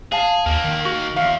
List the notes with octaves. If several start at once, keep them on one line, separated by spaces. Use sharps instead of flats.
G#4 F5 A5
D#2 A#3 D#4
D#3
F#4
E2 F5